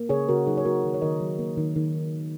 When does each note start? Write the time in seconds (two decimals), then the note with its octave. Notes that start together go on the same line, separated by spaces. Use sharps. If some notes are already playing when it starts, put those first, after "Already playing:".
Already playing: A#3
0.09 C#3 G#4 C#5
0.28 C#3 F#4 A#4
0.46 F#3 D#4 G#4
0.58 C#5
0.65 A#3 F#4 A#4
0.84 D#3
0.94 C#5
1.02 D#3 A#4 D#5
1.20 F#3
1.39 A#3
1.58 D#3
1.76 D#3